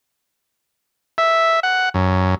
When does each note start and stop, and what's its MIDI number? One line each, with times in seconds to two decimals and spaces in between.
1.18 1.60 76
1.63 1.89 78
1.94 2.35 42